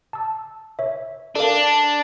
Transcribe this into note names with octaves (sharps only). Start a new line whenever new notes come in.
A5 E6
C#5 E5
D4 A4 A#4 F5